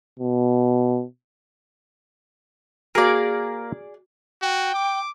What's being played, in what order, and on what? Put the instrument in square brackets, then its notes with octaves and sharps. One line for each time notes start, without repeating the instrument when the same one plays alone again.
[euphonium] B2
[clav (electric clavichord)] A#3 A#4 [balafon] F#4 [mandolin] G#4 D5
[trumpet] F#4 [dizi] G5
[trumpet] D6